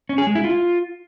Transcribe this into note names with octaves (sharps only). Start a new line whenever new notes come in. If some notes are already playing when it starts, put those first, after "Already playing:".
C#4
G#4
G#3
E4
F4